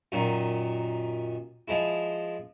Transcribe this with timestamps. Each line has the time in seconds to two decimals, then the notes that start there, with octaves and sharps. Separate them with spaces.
0.12 F#2 A#2 D#3
1.68 F3 G#3 E4